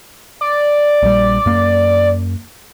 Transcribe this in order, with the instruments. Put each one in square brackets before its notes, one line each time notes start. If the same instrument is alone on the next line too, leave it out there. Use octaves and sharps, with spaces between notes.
[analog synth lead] D5
[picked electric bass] A#1 G3
F#2 A#3